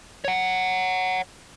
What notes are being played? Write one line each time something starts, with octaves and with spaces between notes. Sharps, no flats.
C#5 F#5